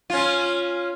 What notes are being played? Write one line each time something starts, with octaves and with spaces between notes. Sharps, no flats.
C#4 F4